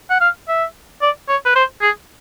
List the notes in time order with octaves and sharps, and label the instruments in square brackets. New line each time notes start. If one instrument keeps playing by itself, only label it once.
[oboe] F#5
F5
E5
D5
C#5
B4
C5
G#4